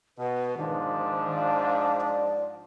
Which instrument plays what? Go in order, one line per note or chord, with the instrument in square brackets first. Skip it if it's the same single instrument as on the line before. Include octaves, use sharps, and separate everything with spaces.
[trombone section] B2 [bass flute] B4
[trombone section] G#2 F3 D4 [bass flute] D#3
[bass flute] F5
D5